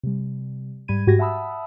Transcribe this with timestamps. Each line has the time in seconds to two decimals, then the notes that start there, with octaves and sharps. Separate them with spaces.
0.03 C3 G3
0.88 G#2 G3 B5 G#6 D#7
1.07 G#2 F#4 G4 G#6 A#6
1.19 E5 F#5 A5 B5 D#6 E6